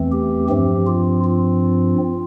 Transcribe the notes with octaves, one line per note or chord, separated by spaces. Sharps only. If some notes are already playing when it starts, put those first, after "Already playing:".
Already playing: E2 E3 A3 C4
G4
G2 F3 C4 G4
F4
F4